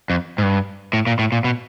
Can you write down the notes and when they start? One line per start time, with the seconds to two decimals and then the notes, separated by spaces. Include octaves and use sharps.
0.10 F2
0.38 G#2
0.43 G2
0.93 A2
1.07 A#2
1.19 A2
1.32 A#2
1.44 B2